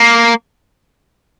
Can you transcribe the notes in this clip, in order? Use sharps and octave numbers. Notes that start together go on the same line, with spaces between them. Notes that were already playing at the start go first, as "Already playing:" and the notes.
Already playing: A#3